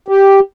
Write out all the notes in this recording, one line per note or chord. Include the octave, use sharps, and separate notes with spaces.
G4